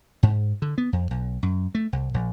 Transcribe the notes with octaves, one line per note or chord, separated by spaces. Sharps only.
G#2
D3
B3
F2
B1
F#2
A3
C2
A#1